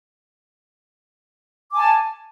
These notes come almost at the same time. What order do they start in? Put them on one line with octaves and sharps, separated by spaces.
D6 G#5 A5